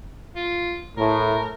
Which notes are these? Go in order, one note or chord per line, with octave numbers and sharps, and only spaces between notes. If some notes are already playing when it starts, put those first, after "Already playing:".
F4
A2 A#4